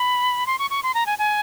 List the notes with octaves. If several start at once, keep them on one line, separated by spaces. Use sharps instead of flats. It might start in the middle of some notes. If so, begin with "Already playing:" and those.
Already playing: B5
C6
C#6
C#6
C6
A#5
G#5
G#5